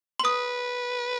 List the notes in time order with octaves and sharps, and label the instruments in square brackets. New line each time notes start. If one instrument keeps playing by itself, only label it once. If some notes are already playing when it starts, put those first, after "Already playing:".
[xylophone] C6
[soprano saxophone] B4 [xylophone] D#6